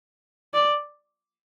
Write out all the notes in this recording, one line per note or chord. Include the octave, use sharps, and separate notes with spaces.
D5